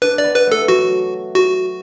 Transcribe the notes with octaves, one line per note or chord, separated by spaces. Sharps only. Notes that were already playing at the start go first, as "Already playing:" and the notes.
D4 B4
D5
B3
B4
A3 A4
F#3 F#4
F#4